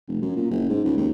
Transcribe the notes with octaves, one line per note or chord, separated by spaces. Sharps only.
F1
F#2
A#2
F#1
G#2
C#2
D#2